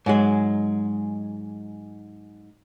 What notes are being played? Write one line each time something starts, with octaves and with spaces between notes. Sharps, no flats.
G#2 F#3 G#3